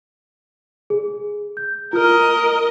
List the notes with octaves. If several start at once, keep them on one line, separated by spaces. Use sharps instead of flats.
G#4
G6
F4 A#4 D#5 F6